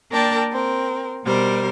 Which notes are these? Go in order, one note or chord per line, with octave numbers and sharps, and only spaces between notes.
A#3 D4 A#4 D5 G5 A5
C4 A#4
B2 G3 A#4 C5